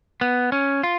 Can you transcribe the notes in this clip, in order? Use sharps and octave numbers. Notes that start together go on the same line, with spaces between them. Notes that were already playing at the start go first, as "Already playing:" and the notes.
B3
C#4
F4